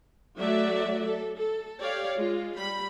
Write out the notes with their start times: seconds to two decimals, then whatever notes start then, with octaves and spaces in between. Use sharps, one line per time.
0.37 F#3 A3 F#4 D5 E5
1.04 A4
1.38 A4
1.80 G4 C#5 D5 F5
2.16 G#3 F4
2.56 G3 B5